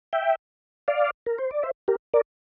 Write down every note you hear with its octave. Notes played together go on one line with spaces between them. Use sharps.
E5 G5
D5 F5
A#4
C5
D5
C5 E5
G4 A#4
A#4 D5